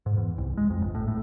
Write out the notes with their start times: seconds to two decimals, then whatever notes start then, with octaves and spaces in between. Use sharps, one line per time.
0.06 G#2
0.17 E2
0.38 C2
0.57 G#3
0.70 F2
0.81 G1
0.95 A2
1.08 A2